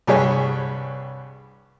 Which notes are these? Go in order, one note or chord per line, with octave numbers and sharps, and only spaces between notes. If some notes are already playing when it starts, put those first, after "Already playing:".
C2 G2 G#4 C#5